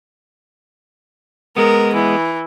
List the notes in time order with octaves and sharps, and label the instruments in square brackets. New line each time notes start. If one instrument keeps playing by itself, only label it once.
[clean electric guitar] G#3 B3 [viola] A#4
[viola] E3